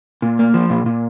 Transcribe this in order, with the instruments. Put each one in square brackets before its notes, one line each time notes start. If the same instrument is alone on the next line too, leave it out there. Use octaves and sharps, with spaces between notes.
[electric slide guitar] A#2
A#3
F3
A#2
A#2